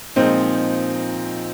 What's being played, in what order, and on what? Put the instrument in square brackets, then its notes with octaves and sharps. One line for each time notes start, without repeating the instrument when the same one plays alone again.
[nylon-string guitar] A#2 F3 G#3 [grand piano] C4 D#4